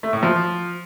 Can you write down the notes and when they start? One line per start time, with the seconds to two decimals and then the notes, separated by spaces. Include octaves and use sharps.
0.03 A3
0.13 A2
0.23 F3